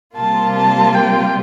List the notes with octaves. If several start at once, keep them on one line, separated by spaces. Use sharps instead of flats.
C3 G3 A#3 F4 A5
A5
G5